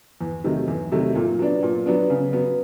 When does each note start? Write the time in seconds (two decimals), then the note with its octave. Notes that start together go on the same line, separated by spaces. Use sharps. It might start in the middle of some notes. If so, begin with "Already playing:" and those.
0.21 E2
0.44 C3 D#3 F#3 A3
0.68 E2
0.92 C3 D#3 F#3 A3
1.15 A#2
1.39 F#3 B3 D4
1.63 A#2
1.86 F#3 B3 D4
2.10 C#3
2.33 F#3 B3